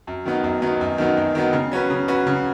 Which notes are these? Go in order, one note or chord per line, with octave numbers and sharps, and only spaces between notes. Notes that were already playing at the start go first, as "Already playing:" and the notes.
F#2
D#3 F#3 B3 D#4
F#2
D#3 F#3 B3 D#4
F#2
D#3 F#3 B3 D#4
F#2
D#3 F#3 B3 D#4
C#3
F#3 C#4 F#4 B4
C#3
F#3 C#4 F#4 B4
C#3